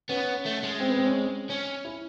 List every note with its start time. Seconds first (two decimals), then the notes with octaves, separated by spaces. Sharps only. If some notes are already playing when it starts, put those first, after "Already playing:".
0.09 B3 C#4
0.45 A3
0.63 G#3
0.80 C4
0.88 B3
0.97 C4
1.06 C#4
1.50 C#4
1.85 E4